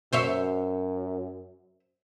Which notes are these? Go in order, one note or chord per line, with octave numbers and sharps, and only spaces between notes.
F#2 C5 C#5 E5